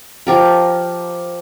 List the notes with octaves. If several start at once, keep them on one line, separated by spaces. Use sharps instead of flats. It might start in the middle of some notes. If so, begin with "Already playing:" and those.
F3 G4 A#4